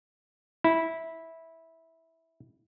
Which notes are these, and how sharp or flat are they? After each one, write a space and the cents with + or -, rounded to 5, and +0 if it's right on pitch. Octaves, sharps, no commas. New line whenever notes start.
E4 -15